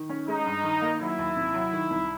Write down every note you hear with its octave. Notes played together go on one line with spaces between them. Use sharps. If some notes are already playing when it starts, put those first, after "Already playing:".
Already playing: D#3
C#4
G#3 D#4
G2
D#3
A#3
F#3 E4
D#2
C3
F#3
D#3
C2